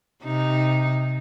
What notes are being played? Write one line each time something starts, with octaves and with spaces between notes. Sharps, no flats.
C3 D#4